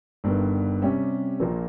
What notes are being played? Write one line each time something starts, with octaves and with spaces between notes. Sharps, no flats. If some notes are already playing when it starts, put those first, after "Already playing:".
G1 G2 D#3
C3 G3 C#4
A#1 A#2 F3 A#3